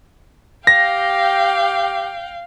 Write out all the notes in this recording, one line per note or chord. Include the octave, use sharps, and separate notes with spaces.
G4 F5 G5 A#6